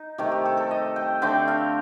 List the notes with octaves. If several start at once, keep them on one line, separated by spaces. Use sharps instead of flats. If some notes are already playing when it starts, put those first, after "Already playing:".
Already playing: D#4
C3 D#3 A3 G4
G4
A4
A4
D#5
G5
D3 A3 C4 G5
F5